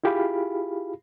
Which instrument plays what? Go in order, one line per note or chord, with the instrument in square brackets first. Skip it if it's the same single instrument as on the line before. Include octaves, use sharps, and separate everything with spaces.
[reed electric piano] E4 F4 G4 G#4 F5 B5